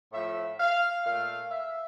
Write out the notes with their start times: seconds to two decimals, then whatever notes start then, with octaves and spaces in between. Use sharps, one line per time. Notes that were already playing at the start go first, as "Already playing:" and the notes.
0.13 A2 F3 A3 E5
0.60 F5
1.05 A#2 A3 F5
1.51 E5